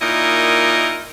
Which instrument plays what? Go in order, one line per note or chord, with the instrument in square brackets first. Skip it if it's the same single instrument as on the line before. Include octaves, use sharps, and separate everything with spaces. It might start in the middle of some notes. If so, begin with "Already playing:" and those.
[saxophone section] A#2 D#4 E4 A#4 D#5